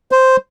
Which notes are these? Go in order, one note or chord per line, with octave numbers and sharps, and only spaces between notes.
C5